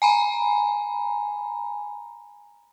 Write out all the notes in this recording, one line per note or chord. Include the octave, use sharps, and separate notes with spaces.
G#5 A#5 B5